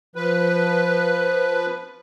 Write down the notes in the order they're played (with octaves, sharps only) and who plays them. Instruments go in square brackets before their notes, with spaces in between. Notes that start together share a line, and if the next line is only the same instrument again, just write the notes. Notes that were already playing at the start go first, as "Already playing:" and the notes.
[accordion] F3 B4